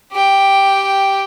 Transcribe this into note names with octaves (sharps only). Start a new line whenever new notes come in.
G4 G5